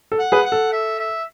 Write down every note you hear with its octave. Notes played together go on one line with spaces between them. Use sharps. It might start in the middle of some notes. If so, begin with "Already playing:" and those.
A4
F#5
G#4 B4
F#5
A4
E5
E5